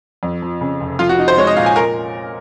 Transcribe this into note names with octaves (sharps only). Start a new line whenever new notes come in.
F2
F3
C#3
F1
F3 F4
F#4
D#4
C5
G#3 C#5
D#5
A#2 F5
G#5
A#4